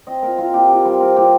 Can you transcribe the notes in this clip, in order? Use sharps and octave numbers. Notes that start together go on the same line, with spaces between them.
C4 D#5
A#2 A#4
C4 F4
A#2 G4
A#2 G4
G3 C5
C4 A#4
A#2 G4